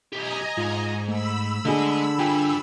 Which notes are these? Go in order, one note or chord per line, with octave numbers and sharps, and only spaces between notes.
B1 G4 D#5 G#5 A#5
G#2 F4
A3 B5 E6
D3 G#3 G#4 D#5
D4 F4 G4 G5 G#5